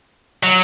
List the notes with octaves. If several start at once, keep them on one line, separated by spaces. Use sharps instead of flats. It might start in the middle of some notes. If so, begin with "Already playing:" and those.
F#3